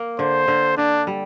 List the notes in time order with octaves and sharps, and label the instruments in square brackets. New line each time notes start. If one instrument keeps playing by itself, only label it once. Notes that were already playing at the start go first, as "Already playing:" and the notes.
Already playing: [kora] A#3
[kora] D3 [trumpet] C5
[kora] D3
[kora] D3 [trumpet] D4
[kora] G3